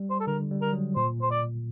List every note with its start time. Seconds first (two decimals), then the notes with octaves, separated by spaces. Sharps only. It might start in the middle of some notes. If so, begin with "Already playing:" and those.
Already playing: G3
0.10 C5
0.20 A4
0.27 D3 A#4
0.51 G3
0.62 A#4
0.73 F#3
0.96 A#2 C5
1.22 C5
1.31 D5